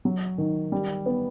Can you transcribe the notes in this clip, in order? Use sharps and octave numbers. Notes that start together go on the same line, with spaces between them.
F#3
D#3
G3
B3